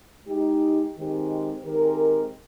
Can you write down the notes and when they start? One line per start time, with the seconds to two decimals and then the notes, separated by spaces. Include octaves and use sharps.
0.25 G#3 D#4 G4
0.95 D#3 G#3 C4 G4
1.65 D#3 G#3 C4 G4 A#4